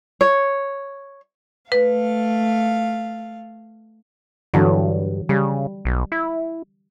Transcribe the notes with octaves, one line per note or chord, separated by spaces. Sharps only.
C#5
A3 B4 F5
G2 D3 E3 F#3
C#3 G3
B1
E4